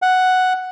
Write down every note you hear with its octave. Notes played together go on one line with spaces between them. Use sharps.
F#5